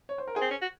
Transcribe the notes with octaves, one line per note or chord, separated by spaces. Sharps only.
C#5
C5
A#4
G#4 C5
C4
C#4
F#4